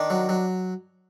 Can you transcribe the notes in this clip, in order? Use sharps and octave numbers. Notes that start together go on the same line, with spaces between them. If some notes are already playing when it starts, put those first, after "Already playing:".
Already playing: D#3 D4
F#3
F#3